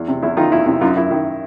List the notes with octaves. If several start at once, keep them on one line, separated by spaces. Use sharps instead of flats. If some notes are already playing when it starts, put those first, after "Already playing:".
Already playing: E2
C3
E2 E4
D#3 D#4 F4
E2 E4
C3 E4
F#2 D#4 F4
F#2 E4
D#3 E4